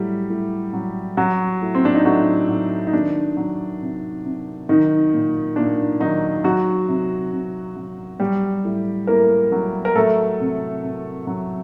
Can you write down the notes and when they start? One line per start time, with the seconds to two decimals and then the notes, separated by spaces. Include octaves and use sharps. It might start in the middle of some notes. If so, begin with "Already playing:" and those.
Already playing: A2 F#3 G3 G4
0.30 A2
0.73 F#3
1.17 F#3 F#4
1.62 A2
1.75 C4
1.85 D4
1.95 D#4
2.05 A2 F#3 F#4
2.49 F#3
2.87 D#4
2.93 D#3 D4
3.37 F#3
3.81 C3
4.24 C3
4.69 D#3 F#3 D#4
5.13 A#2
5.56 A#2 D4
6.00 D#3 F#3 D#4
6.44 F#3 F#4
6.88 C3
7.32 C3
7.76 F#3
8.20 F#3 G3 G4
8.65 A2
9.07 A2 A#3 A#4
9.52 F#3
9.85 A#4
9.95 F#3 A3 A4
10.40 C3
10.83 C3
11.27 F#3